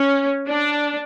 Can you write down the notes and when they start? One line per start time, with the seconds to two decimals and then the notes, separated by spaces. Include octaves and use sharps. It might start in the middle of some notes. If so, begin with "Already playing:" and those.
Already playing: C#4
0.48 D4